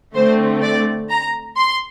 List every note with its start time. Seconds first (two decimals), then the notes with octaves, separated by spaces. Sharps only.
0.15 D3 A3 C4 C5
0.62 D5
1.10 A#5
1.57 C6